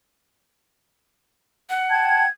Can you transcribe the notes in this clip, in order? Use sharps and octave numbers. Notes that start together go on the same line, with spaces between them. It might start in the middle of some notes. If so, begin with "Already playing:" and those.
F#5
G5 A5 G#6